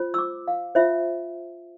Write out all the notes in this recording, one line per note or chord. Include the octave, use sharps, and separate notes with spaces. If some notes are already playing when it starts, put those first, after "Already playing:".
Already playing: F4 C5
E6
D6
F5
F4 C5 E5